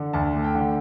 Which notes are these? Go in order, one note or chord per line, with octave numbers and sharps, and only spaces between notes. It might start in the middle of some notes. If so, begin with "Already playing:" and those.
Already playing: D3
D2 A5
A3
G5
D3